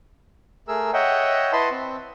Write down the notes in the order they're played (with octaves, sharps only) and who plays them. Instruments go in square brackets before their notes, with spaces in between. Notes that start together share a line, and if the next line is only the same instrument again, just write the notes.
[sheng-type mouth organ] A3 G#4 A#4 E6
C#5 D#5 E5 F#5 G5
E4 B4 D#5 A5 B5 C6
C4